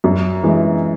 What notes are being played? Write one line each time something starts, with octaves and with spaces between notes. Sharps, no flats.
F#2
E3 G#3